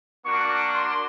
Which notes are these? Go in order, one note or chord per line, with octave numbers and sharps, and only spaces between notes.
A#3 D4 F#4 C#6
C6